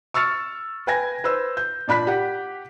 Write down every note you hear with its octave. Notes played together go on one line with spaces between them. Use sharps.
C#6 E6 F6 A6 C#7
B4 G5 G#5 G#6 A#6
B4 C5 E6
G6
A#2 D4 B5 F#6 B6
G4 F#5